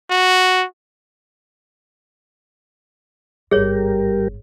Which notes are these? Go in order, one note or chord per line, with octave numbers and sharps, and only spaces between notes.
F#4
G1 G#2 G3 G4 G#4 A#4 C#5